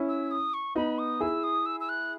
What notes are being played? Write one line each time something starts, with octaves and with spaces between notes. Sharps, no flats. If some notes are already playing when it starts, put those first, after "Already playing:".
Already playing: C#4 E4
E6
D#6
C#6
B3 D#4 B5
D#6
E4 G#4 E6
D#6
E6
E6
F#6